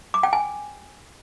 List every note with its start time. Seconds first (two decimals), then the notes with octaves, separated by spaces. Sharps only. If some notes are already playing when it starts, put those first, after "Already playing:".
0.14 D6
0.23 G5
0.33 G#5